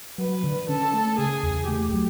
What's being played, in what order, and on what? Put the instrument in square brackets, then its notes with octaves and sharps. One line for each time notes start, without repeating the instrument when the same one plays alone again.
[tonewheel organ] F#3 [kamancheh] B4
[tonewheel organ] D3
[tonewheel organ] C#4 [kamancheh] A4
[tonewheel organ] A3
[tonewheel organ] C#3 [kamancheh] G#4
[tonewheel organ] E2
[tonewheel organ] A3 [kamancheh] G4
[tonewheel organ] F#3